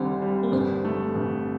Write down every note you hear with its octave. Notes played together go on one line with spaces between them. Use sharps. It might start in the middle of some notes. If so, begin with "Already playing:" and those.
Already playing: D2 D3 D#3 G3 C4 D4
G3
A#3
G1 C4
A3
G1